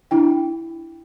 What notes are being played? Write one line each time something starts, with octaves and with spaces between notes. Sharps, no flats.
D4 E4 G5